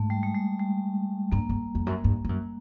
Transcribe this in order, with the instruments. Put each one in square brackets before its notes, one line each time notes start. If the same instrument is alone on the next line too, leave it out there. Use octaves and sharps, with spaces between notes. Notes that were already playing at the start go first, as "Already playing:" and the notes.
Already playing: [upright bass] G#2 [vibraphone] A3
[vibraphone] G3
G#3
G3
G3
[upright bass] G2 [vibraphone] A#3
[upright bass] G2
F2
F#2
G2
G2
F#2